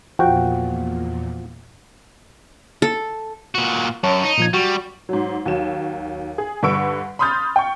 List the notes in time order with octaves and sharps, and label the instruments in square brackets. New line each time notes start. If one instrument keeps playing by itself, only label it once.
[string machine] E2 A#2 [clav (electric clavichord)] F3 F#4 [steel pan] G5
[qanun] A4
[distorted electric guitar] A#2 F#4
[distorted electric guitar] F#2 [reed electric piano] C#5 A5 C#6
[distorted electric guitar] D#4
[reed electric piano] A#2 F3 G#6
[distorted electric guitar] G3 [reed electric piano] F#4 C#6
[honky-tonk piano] G#2 F#3
D#2 F#3 E7
G#4
G2 D3 B4 C#6 E6 D7
B5 C6 D#6 F6 G6 A6
G5 C#6